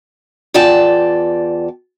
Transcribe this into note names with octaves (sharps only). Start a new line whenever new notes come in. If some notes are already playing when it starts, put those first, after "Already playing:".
E2 F4 D5 G5 A5